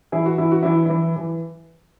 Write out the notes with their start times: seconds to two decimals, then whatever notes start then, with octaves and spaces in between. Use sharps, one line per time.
0.12 E3 E4 G#4
0.26 F#4
0.38 E3 E4
0.52 F#4
0.63 E3 E4
0.86 E3 E4
1.16 E3